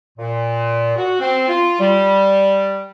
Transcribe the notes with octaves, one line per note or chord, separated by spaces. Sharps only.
A#2
F#4
C4
F4
G3